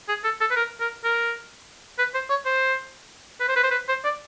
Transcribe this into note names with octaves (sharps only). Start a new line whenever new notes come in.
G#4
A4
A4
B4
A#4
A#4
A#4
B4
C5
C#5
C5
B4
C5
B4
C5
B4
C5
D5